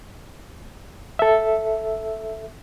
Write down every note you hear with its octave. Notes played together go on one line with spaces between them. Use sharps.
A4 E5